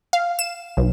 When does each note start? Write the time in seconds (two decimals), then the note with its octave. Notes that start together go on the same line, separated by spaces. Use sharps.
0.13 F5
0.39 E7
0.77 B1